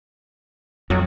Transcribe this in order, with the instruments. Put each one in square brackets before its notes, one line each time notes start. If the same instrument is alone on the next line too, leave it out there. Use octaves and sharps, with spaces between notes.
[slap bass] F2 [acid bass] F#3